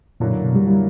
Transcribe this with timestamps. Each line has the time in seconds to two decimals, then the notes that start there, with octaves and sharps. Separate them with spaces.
0.20 F#2 A#2 D3 F#3 A#3 E4
0.44 B2
0.56 G3
0.67 D3 F#3 A#3 E4